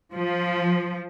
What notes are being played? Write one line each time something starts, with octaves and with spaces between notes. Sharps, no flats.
F3